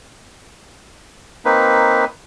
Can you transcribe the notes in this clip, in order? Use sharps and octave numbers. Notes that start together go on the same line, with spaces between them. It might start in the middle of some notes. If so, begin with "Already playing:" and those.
A#3 C4 D#4 B4